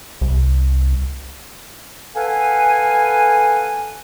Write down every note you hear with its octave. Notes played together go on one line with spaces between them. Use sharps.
C2
A4 B4 F5 F#5 G#5